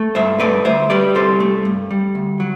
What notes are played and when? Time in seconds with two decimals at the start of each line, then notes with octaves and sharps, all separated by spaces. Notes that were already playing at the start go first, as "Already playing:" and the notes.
Already playing: A3
0.15 G2 C5 E5
0.40 A3 B4 D5
0.65 D2 C5 E5
0.90 G3 B4 D5
1.15 C2 A4 C5
1.40 A3
1.65 G2
1.91 G3
2.15 D2
2.40 F#3